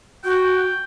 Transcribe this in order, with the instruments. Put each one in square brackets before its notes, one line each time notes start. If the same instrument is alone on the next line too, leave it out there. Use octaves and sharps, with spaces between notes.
[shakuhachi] F#4 [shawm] G5